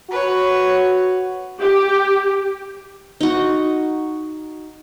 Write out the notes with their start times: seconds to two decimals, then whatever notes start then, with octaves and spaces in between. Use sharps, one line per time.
0.11 F#4 B4 C#5
1.61 G4
3.21 D#4 F#4